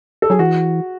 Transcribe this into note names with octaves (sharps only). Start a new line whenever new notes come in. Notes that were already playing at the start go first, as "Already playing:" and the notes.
A4
F#3 G#4
E3 F#4